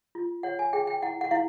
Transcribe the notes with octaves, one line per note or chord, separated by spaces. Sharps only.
F4
C#5 F#5
G#5
G#4 G5
G5
E4 F#5
F#5
E4 F5